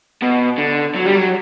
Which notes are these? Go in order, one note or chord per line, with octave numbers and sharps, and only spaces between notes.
B2
D3
F#3
G3
F#3